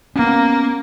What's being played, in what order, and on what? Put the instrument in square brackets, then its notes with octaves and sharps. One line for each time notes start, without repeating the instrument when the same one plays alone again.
[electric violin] A#3 [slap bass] B3 C#4